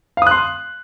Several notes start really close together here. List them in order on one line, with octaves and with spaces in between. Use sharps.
F5 D#6 F#6 C6